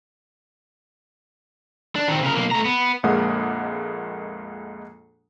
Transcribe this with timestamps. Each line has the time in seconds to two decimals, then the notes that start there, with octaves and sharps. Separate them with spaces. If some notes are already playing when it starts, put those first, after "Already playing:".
1.95 D4
2.08 D#3 C4
2.22 C#3 A#4
2.34 B1 A#3
2.51 A3 A#5
2.65 B3
3.03 A#1 F2 G#3 A#3 F#5 D#6